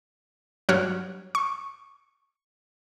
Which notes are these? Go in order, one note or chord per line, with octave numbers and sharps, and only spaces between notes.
G2 F#3 C#5 F#5 F6
C#6